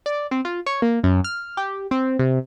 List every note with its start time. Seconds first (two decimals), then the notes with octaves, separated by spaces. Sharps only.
0.06 D5
0.31 C4
0.45 F4
0.66 C#5
0.82 A#3
1.04 F#2
1.24 F6
1.57 G4
1.91 C4
2.19 C3